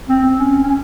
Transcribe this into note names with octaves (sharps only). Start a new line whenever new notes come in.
C4
C4
C#4
C#4